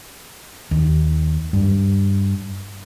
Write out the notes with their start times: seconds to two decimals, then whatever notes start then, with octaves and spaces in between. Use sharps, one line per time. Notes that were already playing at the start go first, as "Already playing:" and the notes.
0.71 D#2
1.53 G2